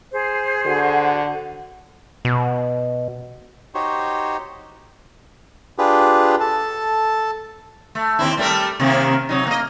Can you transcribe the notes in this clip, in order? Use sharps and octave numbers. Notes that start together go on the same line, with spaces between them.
G#4 C5
D3 F#4 F#5
B2
D#4 F#4 G4 C5 C#5
D4 F4 G4 G#4 B4
A4 A5
A3
D#2 C4 E4
G3 A3 A#4
C3 D#3 A#3
C3 F#3 D#4
A#3 D#5